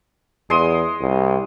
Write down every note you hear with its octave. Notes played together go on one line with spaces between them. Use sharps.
E2 G#3 C6 D#6
C2